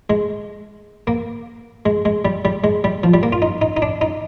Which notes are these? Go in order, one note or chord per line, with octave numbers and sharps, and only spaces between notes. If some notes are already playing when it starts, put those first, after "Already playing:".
G#3
A#3
G#3
G#3
G3
G3
G#3
G3
F3
G3
A#3
F4
D#4
D#4
D#4
D4
D#4